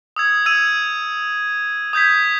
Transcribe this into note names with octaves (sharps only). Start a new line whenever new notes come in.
D#6 E6 G#6
E6 G#6 D#7
D#6 G6 G#6 B6